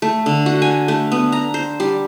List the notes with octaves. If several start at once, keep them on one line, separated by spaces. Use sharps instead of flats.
A3
D3
F#4
G#5
A3
B3
A#5
C5
G3